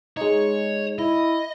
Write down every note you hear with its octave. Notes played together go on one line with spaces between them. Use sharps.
G#3 D#4 C#5
E4 D#5